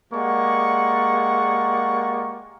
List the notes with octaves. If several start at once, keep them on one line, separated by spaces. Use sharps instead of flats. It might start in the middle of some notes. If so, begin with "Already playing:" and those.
G#3 A#3 G4 D5 F#5 C#6